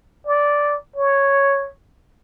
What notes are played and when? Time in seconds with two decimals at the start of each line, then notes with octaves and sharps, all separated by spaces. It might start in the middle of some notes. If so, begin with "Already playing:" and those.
0.27 D5
0.96 C#5